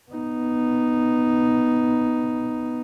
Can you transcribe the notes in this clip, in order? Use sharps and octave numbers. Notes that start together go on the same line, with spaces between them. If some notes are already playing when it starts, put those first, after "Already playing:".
B3 D#4